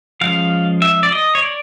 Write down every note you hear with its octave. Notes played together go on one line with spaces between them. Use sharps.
F3 G#3 C#4 F5
E5
D5
D#5
C#5
D5